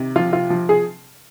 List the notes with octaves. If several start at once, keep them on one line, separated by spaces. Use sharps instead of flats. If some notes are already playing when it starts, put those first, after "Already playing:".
Already playing: C3 D#3
F3 F4
F4
F3
G#4